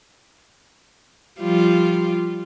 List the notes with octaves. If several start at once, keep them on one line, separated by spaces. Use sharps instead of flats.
F3 G3 F4